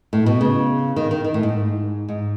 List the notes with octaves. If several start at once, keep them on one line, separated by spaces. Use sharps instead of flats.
A2
B2
C#3
D#3
D#3
D#3
A2
G#2
G#2